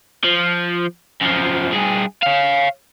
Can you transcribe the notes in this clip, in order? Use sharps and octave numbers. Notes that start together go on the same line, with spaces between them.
F3
F#2 F3
G2 G#4
C#5 F5